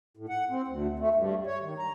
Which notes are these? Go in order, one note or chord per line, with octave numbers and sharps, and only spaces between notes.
A2
F#5
C4
D2
A3
G2
C#5
D#3
A#5